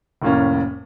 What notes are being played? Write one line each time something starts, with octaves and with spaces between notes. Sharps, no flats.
F1 A2 A#3 C#4